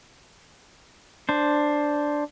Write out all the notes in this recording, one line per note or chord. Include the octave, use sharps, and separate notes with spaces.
D4 C5